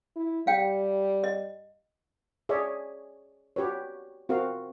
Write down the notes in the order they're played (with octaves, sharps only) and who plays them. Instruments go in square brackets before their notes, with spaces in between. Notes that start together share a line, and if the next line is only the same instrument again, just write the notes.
[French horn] E4
[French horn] G3 [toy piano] F5 G5
[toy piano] D#5
[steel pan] G#4 C#5 D5 E5
F#4 G4 B4 C#5
C4 F#4 A#4 F5